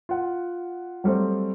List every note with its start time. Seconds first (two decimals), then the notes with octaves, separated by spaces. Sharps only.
0.09 F4 F#5
1.04 F#3 G3 A3 C4